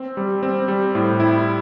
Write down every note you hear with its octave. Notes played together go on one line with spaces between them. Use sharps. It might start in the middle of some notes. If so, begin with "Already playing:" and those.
Already playing: C4
G3
C4
G3
A2
E4